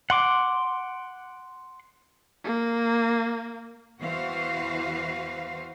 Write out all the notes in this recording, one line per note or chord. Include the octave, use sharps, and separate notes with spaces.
F#5 C6 D6
A#3
E2 E3 F#4 B4 C5 F5